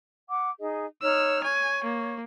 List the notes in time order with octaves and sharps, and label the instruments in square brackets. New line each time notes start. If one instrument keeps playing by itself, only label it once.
[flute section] F#5 D6
D#4 G#4 D#5
[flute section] D#4 C#5 [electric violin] E6 F6
[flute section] C#5 C#6 [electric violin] G#5
[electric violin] A#3